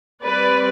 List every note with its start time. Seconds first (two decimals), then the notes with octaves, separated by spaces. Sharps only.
0.23 G3 C4 B4 D5